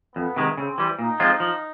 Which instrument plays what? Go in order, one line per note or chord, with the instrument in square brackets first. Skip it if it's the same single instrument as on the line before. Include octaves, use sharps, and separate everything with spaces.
[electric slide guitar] F2 [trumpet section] B3
[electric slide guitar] C3 D#3 G#3
[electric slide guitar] C#3 [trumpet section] C4
[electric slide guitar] E3 G3
[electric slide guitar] A#2 [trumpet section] D#4
[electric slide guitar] F3 G#3 C4 F4
F3